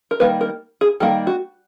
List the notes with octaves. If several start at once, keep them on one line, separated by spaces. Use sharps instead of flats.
A#4
D#3 G3 A#3 B4
A#4
G#4
D#3 G3 A#3 A4
F#4